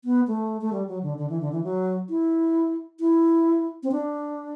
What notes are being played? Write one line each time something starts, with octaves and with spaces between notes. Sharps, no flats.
B3
A3
A3
G3
F#3
D3
D3
E3
D3
E3
F#3
E4
E4
C4
D4